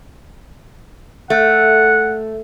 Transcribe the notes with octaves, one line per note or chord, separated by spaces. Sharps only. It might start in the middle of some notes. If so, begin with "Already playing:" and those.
A3 F#5